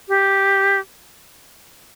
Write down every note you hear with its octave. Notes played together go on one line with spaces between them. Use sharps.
G4